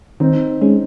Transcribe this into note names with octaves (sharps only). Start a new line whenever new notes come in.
D#3 C4 D#4
G#3 C#4